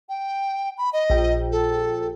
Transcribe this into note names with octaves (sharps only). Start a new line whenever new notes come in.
G5
B5
D#5
A#1 G5
A4